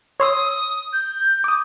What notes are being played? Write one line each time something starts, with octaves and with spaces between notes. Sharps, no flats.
C#5 C6 D#6 E6
G6
D6 D#6